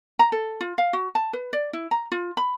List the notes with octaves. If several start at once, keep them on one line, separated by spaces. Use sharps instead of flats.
A#5
A4
F4
F5
F#4
A5
B4
D5
E4
A#5
F4
B5